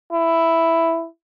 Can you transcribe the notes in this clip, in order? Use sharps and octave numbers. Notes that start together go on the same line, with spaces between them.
E4